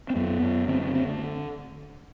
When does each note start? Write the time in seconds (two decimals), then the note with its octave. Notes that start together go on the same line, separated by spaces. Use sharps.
0.10 C4
0.16 F#2 B3
0.42 F#2
0.68 D3 C4
0.82 C4
0.94 D3 C4
1.08 A3